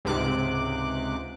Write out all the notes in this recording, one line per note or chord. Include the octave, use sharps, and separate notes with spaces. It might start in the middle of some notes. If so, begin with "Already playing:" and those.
C#2 G#2 C3 D6 F#6